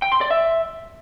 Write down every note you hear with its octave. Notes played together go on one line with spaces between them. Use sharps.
G5
C6
D5
E5